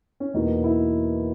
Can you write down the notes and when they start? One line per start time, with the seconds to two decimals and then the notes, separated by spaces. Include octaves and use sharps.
0.20 C#4
0.34 E2 B2 A#3 D#4
0.64 E4